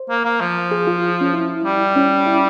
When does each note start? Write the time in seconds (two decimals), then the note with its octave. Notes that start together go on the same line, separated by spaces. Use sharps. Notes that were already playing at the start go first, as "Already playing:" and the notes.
Already playing: C5
0.10 A#3
0.25 A#3
0.41 F3
0.71 G#4
0.87 F4
1.21 C#4
1.33 E4
1.64 G3
1.96 C#4
2.27 E4